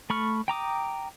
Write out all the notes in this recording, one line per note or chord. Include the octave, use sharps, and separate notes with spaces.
A3 B5 C#6 F6
G5 A#5 D6 D#6